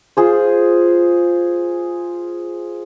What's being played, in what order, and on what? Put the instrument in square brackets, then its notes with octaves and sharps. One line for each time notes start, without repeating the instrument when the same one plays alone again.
[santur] F4 G#4 C5